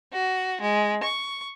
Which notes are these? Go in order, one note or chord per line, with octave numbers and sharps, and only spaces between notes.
F#4
G#3
C#6